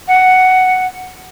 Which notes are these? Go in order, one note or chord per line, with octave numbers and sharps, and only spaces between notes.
F#5